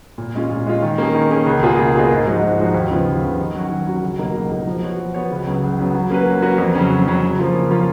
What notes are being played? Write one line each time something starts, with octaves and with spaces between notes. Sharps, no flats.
A#2
G#3 C#4 F4
A#2
G#3 C#4 F4
D#3
A#3 C#4 G#4
D#3
A#3 C#4 G#4
C#2
B2 A#3 F4 G#4
C#2
B2 A#3 F4 G#4
G#2
F3 G#3 D#4 F#4
G#2
F3 G#3 D#4 F#4
D#2
C#3 F3 B3 F4
D#2
C#3 F3 B3 F4
D#3
F#3 C#4 F#4
D#3
F#3 C#4 F#4
C#2
B2 F#3 A#3 D#4
C#2
B2 F#3 A#3 D#4
F3
B3 F#4 C#5
F3
B3 F#4 C#5
C#2
C#3 F#3 B3
C#2
C#3 F#3 B3
F#3
A#3 C#4 F#4 B4
F#3
A#3 C#4 F#4 B4
F2
C#3 F#3 C#4
F2
C#3 F#3 C#4
C#3
F3 A#3 C#4 F4
C#3
F3 A#3 C#4 F4